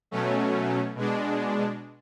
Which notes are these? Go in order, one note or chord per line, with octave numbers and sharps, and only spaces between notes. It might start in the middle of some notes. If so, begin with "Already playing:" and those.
B2 F#3 A3 C#4
B2 G#3 D4